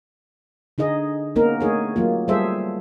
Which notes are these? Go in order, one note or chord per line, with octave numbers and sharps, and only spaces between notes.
D3 D#4 G#4 D#5
G#3 A#3 B3 C#4 D#4 A#4
A3 D#4 G#4 C#5
F#3 A#3 F4
G3 F4 G#4 A4 C5 E5